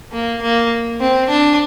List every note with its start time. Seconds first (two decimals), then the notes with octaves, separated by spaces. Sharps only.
0.12 A#3
0.41 A#3
1.00 C4
1.29 D4